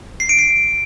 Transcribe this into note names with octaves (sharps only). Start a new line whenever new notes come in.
C7
D7
C7